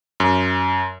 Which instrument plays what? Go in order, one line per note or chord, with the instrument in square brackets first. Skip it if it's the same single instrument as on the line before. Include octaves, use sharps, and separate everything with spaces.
[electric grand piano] F#2